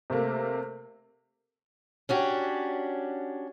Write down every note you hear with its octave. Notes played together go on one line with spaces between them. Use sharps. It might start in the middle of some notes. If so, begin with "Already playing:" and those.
C3 A3 A#3
C#4 D4 F#4 G4